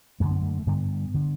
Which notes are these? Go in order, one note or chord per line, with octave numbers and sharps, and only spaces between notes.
F#2 D3 A3
B3
A3
A3
G2 D3 B3
D3